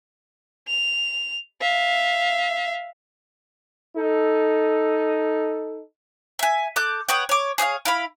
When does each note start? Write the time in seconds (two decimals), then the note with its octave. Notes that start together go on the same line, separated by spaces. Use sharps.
0.68 F7
1.61 E5 F5
3.97 D#4 A4
6.39 E5 G#5
6.76 A4 D6 F#6 G6
7.09 B3 C#5 F#5 G5
7.29 C#5 D6
7.58 G#4 C#5 D#5 F5
7.85 E4 F5 B5